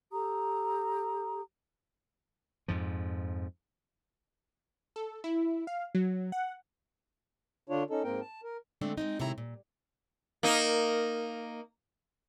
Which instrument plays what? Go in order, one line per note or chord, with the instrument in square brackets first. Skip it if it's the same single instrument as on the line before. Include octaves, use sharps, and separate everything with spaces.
[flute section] G4 A4 A#5 D#6
[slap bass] F2 G#2 F3
[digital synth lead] A4
E4
F5
F#3
F#5
[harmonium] D3 D4 F4 C#5
C#4 D#4 A4
G#2 A#3 C4 A#4 G5
A5
A#4
[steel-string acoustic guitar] D3 G#3 A3 C4 D4
G#3 C4 D#4
A2 C3 D#3 G#3 E4 A#5
A#2
[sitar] A#3 D#4